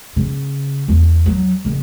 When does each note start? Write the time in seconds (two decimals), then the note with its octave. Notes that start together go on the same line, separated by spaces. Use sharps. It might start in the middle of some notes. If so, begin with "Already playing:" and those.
0.16 C#3
0.88 E2
1.26 F#3
1.65 F#1